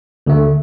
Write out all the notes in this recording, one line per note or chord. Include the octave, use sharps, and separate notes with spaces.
D2 D3 A3